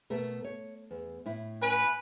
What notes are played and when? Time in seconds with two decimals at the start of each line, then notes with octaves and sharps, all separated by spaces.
0.10 B2 A3 A#4
0.44 C#5
0.91 E2
1.26 A2 E4
1.61 C#4 B4